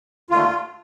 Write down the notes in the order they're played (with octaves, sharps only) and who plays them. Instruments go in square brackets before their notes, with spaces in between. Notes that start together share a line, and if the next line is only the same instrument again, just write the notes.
[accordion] D#2 D3 A3 F4